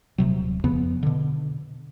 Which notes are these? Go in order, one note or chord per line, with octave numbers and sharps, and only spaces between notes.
D#1 C3 F#3
F2 C#3 F3 B3
B2 D3